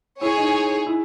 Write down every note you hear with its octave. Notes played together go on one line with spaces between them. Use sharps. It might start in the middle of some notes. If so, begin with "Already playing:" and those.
E4 G#4 C#5 G#5
D#4
E4